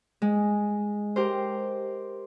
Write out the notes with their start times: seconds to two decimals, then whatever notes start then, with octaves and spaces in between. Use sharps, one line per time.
0.22 G#3
1.16 G4 A#4 C5